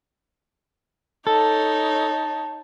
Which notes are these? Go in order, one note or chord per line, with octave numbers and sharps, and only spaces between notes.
D#4 A4 C#5 A5